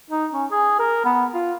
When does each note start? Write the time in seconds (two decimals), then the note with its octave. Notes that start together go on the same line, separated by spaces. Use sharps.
0.10 D#4
0.33 C#4
0.51 G#4
0.80 A#4
1.05 B3
1.34 F4